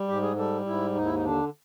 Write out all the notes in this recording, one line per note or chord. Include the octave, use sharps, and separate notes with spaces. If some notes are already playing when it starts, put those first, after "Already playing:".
Already playing: G3
G#2 G4
G#4
G3 A4
G#2 E4
D#2 D#4
E4
D#4
D3 D4